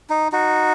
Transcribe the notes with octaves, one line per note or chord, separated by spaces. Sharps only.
D#4
D#4 F#4